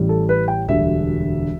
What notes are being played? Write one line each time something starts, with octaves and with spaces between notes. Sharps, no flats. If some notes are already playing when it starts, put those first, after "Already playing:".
Already playing: A1 A2 G3
A4
B4
G5
E1 D2 D3 G3 E5